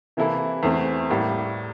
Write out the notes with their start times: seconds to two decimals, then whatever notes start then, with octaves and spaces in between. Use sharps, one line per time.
0.17 C3 E3 A#3 E4 A4
0.63 E2 E3 A3 C4
1.09 A2 G3 A#3